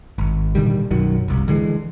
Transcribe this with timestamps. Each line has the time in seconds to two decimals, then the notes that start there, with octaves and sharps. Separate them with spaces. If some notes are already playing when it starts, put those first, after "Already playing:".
0.18 G#1
0.55 A#2 D3 D#3 G3
0.91 B1 F#2 D#3 F#3
1.28 F1 C2
1.48 D3 E3 G#3